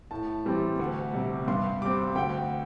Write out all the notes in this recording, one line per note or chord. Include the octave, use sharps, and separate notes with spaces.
A2 A5
E3 G3 C4
D2
C3 G3
G2 C6
G3 C4 D6
D2 G5